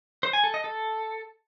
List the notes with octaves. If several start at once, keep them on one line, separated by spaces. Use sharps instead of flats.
C5
G#5
A4
D#5
A4